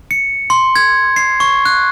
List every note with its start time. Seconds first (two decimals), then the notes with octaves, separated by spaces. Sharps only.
0.11 C#7
0.50 C6
0.76 G#6
1.16 C7
1.40 C#6
1.65 F#6